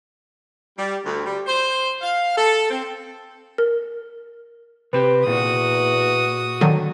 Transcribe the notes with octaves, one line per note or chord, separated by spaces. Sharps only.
G3
D2
G3
C5
F5
A4
C4
A#4
C3 C4 G4 B4
E2 A#2 F#4 D#6
D3 D#3 F#3